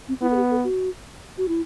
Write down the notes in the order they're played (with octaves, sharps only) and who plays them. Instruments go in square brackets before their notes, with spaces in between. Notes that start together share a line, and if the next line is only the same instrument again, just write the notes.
[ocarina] C4
[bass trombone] B3 [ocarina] E4
[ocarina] A4
G4
A4
F#4
F#4
E4